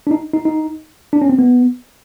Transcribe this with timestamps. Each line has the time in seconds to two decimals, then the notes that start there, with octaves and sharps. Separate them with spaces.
0.07 D4
0.11 D#4
0.34 D#4
0.45 D#4
1.13 D4
1.22 C#4
1.30 C4
1.39 B3